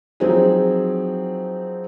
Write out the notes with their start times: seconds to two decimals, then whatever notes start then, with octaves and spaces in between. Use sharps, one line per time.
0.20 F3 F#3 C4 D#4 G#4